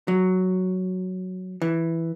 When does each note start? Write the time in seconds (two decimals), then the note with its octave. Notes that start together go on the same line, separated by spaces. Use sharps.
0.08 F#3
1.62 E3